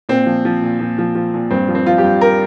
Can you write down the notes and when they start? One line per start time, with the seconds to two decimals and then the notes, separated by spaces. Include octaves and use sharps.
0.09 A#2 C4
0.26 F3
0.45 F3
0.62 A#2
0.80 A#2
0.98 F3
1.15 F3
1.34 A#2
1.50 G2 C4
1.68 F3
1.75 C4
1.86 F3 F4
1.98 G4
2.04 G2
2.21 A#4